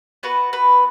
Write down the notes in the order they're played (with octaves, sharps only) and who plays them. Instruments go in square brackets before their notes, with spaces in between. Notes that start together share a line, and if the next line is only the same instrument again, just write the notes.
[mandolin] B3 F#4 B4
B4